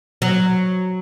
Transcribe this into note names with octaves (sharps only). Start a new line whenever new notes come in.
F#3